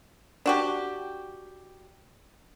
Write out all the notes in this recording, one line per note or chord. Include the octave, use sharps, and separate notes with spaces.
D4 F#4 G4